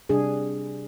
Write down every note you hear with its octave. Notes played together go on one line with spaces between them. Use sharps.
C3 G3 D4 G#4